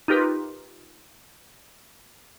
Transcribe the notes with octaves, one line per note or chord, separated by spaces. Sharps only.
D#4 F4 G4 A#4 B4